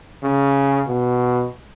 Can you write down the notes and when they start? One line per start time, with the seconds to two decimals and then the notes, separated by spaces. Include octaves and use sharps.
0.23 C#3
0.88 B2